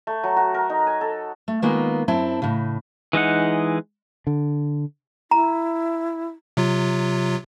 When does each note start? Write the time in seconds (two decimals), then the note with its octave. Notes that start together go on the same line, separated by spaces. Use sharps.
0.07 A3
0.23 F#3
0.36 F#4
0.54 A#4
0.70 D#4
0.87 G#5
1.01 A4
1.48 A3
1.62 D#3 G#3 A#3 B3 F4
2.08 F#2 C4 E4 A5
2.42 A2 C#3
3.13 E3 G#3 D#4 F#5
4.27 D3
5.31 E4 A#5
6.57 C3 F#3 F4